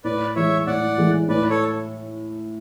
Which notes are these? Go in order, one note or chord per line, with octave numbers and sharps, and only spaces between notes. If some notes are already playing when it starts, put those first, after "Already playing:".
A2 B4 D5
E3 G#3 C#5 E5
A2 D5 F#5
E3 G#3
A2 B4 D5
A4 C#5